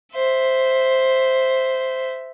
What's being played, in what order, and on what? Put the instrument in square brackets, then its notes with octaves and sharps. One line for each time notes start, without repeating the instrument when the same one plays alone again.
[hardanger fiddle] C5 E5